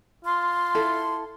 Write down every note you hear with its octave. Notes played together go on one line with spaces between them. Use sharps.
F4 C6
E4 A4